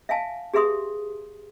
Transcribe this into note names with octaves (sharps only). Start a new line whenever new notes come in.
E5 F5 G#5 A5
G4 G#4 B4 E5 C6 D#6